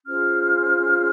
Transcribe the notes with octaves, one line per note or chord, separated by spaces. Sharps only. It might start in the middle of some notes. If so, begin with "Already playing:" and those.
C#4 F4 G#4 C5 F6